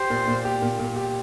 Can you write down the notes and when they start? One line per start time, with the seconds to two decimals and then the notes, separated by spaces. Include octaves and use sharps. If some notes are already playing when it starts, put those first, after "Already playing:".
Already playing: G4 C5
0.10 A#2
0.27 A#2
0.45 G4
0.62 A#2
0.79 A#2
0.96 G4